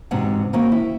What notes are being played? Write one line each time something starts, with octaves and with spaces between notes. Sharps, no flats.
E2 G#2 C3 C#4 F#4 F#5
D#3 A#3 C4 C#4 F#4
E4